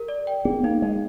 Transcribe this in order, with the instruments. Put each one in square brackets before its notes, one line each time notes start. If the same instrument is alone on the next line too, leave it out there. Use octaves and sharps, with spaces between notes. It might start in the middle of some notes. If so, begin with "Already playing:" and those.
Already playing: [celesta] G4 A#4
D5
G5
[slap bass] B3 [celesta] G#4
[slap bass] A#3 [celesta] D#4
[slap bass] G#3 [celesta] D#4